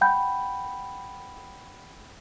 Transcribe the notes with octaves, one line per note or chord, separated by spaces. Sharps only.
F#5 G5 B5 G6